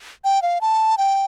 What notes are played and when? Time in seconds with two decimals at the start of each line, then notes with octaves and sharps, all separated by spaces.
0.24 G5
0.42 F5
0.61 A5
0.98 G5